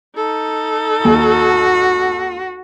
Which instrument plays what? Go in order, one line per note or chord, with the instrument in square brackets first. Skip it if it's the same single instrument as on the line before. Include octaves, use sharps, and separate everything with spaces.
[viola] D#4 A4
[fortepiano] D#2 [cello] F#4